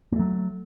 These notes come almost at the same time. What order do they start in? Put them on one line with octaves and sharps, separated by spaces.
A#3 A3 F#3